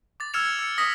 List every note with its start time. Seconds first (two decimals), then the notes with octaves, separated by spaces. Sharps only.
0.20 D6 A6
0.34 E6 F6 G#6 C#7 E7 F7
0.59 E6 C#7
0.78 D#6 A#6 B6